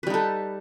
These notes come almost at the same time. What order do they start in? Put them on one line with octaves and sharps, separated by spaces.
B4 G3 D#4 A4